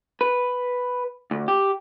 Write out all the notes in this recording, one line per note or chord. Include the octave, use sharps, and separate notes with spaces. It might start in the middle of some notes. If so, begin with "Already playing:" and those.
B4
D2
G4